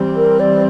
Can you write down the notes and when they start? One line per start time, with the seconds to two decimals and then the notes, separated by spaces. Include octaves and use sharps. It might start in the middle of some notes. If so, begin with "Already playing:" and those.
Already playing: E3 G3 C4
0.16 A#4
0.40 D5